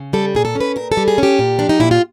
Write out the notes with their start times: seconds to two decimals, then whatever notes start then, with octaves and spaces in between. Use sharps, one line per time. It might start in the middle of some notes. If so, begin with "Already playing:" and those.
Already playing: C#3
0.13 G3 A4
0.35 A#2 G#4
0.45 A4
0.55 C#4
0.60 B4
0.76 A#2 A#4
0.92 A4
0.97 G3
1.08 G#4
1.18 C#4 G4
1.39 A#2
1.59 F3 D4
1.69 D#4
1.80 A#2 E4
1.91 F4